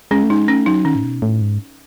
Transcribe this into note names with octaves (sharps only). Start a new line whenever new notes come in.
G#3 C#4
A3
G#3 D#4
A3 C#4
F#3 D#4
D#3 C#4
A2
B2
A2
G#2